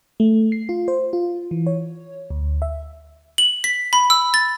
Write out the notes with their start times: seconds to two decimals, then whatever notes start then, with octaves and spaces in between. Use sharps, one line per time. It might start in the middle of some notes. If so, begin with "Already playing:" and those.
0.20 A3
0.52 C7
0.69 F4
0.88 C5
1.13 F4
1.51 E3
1.67 C#5
2.30 D2
2.62 E5
3.38 F#7
3.64 B6
3.93 B5
4.10 E6
4.34 A6